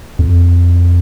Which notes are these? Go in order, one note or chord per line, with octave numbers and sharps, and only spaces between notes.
F2